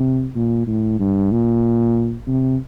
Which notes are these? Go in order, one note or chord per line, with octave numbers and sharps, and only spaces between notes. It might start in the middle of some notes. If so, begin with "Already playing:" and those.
Already playing: C3
A#2
A2
G2
A#2
C3